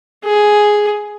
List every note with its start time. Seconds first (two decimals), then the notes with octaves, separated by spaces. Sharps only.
0.24 G#4